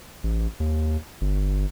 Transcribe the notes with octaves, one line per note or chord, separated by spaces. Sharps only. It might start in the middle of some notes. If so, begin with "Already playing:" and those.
A1
D#2
G1